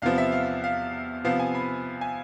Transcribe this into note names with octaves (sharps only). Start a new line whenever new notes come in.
E2 C3 F3 B3 F5
E5
F5
F5
C3 F3 B3 F5
G#5
B5
G#5